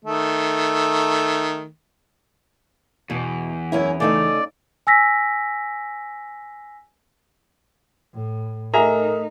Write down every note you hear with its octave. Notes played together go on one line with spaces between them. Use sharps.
D#3 A3
E2 B2
F#2 C#4 E4
C#3 A3 D#4 D5
G#5 E6 A#6 B6
A2
A3 D#4 G#4 A#4 E5 A#5